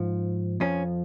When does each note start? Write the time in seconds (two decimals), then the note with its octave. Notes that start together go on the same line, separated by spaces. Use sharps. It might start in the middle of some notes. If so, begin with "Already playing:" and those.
Already playing: G#2 F3
0.60 F2 F3 C#4